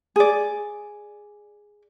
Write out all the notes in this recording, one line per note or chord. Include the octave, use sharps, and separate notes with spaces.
G#4 D5